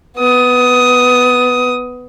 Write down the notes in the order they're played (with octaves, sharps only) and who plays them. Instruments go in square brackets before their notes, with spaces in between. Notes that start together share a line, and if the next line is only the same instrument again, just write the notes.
[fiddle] B3 D#6